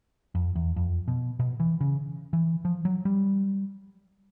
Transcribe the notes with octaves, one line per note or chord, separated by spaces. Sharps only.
F2
E2
F2
B2
B2
E3
C#3
E3
F3
F#3
G3